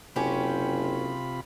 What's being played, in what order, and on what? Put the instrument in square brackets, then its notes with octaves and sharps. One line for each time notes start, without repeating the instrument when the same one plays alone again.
[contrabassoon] F#1 [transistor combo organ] C3 F4 B5 [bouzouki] C#4 G4